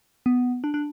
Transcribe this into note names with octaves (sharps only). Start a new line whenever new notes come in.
B3
D4
D4